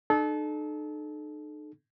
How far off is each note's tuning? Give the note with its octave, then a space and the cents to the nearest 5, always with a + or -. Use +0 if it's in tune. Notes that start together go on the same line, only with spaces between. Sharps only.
D#4 -45 A4 -30